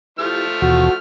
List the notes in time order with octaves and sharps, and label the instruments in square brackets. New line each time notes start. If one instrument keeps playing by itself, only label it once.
[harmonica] F3 A3 F6 [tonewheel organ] E4 G4
[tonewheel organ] D#2 B2 E3 [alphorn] F#4